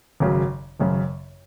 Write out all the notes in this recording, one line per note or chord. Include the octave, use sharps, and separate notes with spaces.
G#1 F#2 C#3 F#3
G#1 F#2 C#3 F#3